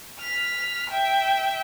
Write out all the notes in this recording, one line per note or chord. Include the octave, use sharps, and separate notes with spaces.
F6 B6
E5 G5